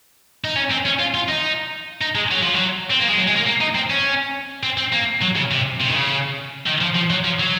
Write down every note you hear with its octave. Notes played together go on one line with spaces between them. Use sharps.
D#4
C#4
C4
C#4
F4
F4
D#4
D#4
G#3
F#3
F3
F#3
C4
A#3
G#3
F#3
G#3
A#3
A#3
D#4
C4
C#4
C4
C4
A#3
F#3
C#3
C3
C3
D#3
C#3
D#3
F3
F3
F#3
F3
F#3